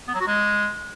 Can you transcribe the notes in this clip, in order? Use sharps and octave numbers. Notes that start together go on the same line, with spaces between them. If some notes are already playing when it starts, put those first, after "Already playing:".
B3
F#3
F#4
G#3